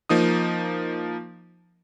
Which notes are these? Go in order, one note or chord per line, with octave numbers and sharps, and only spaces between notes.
F3 A#3 D#4 D#6